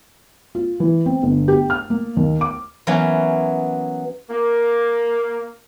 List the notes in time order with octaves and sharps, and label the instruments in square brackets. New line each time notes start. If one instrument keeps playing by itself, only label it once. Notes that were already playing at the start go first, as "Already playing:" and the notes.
[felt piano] F4
E3
C4
G1
G4
F6
A#3
D#2
D6
[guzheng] E3 F#3 A#3 B3 C#4
[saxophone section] A#3